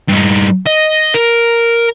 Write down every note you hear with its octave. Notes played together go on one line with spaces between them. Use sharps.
G2 D#4
D#5
A#4